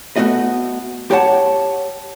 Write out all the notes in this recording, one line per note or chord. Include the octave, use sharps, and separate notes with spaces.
A3 B3 F#4 D#5
G4 C#5 F#5 A5